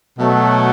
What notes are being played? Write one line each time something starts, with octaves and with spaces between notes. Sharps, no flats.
B2 F#3 A3